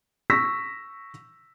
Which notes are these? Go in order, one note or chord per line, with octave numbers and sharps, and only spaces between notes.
C#6 E6 A#6 B6